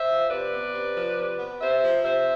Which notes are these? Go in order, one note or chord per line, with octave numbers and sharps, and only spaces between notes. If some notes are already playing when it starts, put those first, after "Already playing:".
Already playing: C5 E5
F3
C3 B4 D5
B3
C3
F3
C3
B3
C3 C5 E5
F3
C3 C5 E5